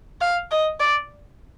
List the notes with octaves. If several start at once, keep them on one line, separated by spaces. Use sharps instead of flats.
F5
D#5
D5